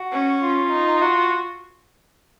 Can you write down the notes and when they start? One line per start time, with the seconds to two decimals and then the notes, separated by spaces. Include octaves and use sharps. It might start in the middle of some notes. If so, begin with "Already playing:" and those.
Already playing: F#4
0.12 C#4
0.42 F4
0.72 D#4
1.02 F#4